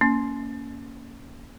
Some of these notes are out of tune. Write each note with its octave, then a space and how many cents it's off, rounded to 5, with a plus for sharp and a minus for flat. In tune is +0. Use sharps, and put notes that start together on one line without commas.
A#3 +0 C#4 +15